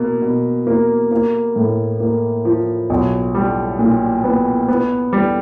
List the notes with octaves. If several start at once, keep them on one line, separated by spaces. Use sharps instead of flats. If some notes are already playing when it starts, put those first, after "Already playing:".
Already playing: B2 A#3
B2
A#3
A#3
A2
A#3
F3
B1
G3
A#2
B3
B3
G3